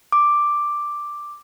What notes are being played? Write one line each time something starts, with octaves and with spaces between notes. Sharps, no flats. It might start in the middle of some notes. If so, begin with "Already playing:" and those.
D6